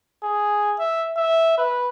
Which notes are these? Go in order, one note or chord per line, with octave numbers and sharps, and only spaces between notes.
G#4
E5
E5
B4